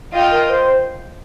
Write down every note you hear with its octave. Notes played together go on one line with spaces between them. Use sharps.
F4 D#5 G5
A#4
C5